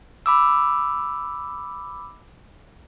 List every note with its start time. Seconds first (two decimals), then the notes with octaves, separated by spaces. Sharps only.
0.26 B5 D6 E6